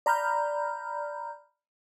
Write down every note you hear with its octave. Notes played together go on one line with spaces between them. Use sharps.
D5 A#5 B5 F6 G6